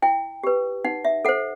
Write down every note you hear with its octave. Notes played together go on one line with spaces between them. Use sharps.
E4 G5
G4 B4
D#4 F#5
E5
A4 C5 F#5